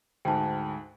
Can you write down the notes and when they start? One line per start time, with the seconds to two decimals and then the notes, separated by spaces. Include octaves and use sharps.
0.25 D2 G#2 G5 A5